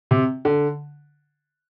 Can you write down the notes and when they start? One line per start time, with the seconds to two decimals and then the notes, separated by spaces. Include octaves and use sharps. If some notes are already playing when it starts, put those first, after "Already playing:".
0.11 C3
0.45 D3